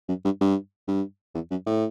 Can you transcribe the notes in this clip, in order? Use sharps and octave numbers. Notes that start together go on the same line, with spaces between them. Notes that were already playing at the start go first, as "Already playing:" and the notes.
F#2
G2
G2
G2
E2
F#2
A2